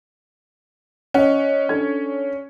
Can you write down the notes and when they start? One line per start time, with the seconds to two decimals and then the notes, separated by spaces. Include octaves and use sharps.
1.14 C#4 D#5 F#5
1.69 D4 A4 G#6